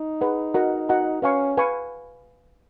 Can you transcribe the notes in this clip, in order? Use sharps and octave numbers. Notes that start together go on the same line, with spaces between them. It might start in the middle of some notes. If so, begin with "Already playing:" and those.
Already playing: D#4
G#4 B4 F#5
F#4 A#4 D#5 F#5 A#5
F#4 A#4 D#5 F#5 A#5
C#4 B4 F5 G#5 C#6
B4 F5 G#5 C#6